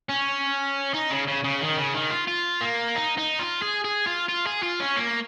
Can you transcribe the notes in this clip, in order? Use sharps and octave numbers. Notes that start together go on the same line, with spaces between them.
C#4
D#4
C#3
C#3
C#3
D#3
C#3
D#3
F4
F4
A#3
D#4
D#4
F4
G#4
G#4
F4
F4
G#4
F4
C#4
A#3